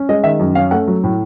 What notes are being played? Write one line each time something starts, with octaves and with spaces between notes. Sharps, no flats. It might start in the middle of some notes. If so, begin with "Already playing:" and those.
Already playing: C#4
G#3 D#5
D#3 E5
F#2
C#4 F5
A3 F#5
F#3
A2